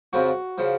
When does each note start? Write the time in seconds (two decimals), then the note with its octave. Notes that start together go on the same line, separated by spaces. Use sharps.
0.13 F2 C#3 F3 F#4
0.58 C#3 F3